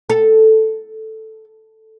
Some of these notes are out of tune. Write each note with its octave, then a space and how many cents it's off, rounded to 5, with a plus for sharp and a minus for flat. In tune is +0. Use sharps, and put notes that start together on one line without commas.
A4 +0